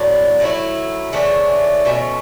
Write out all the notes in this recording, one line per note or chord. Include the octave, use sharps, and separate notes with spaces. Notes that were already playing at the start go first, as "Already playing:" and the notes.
Already playing: A2 F#3 B3 D4
F#3 A3 E4
C#3 E3 A3 D4
B2 A3 C#4